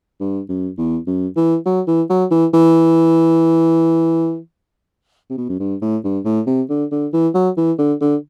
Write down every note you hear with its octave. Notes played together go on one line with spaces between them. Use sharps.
G2
F#2
E2
F#2
E3
F#3
E3
F#3
E3
E3
C3
B2
F#2
G2
A2
G2
A2
C3
D3
D3
E3
F#3
E3
D3
D3